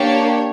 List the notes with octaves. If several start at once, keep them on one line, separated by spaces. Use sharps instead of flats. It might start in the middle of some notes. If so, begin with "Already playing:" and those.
Already playing: A#3 D4 G4 C#5